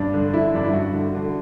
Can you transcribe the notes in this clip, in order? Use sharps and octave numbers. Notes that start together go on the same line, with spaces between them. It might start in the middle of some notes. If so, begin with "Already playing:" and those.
Already playing: G2 D4
D3
D3 E4
G2 D4
E4
G2 F#4
D3
D3